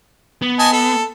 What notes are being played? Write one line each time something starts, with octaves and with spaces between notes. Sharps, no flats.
B3
D#5 G#5 A5
A4